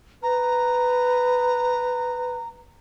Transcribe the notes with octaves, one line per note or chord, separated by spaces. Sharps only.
B4 A#5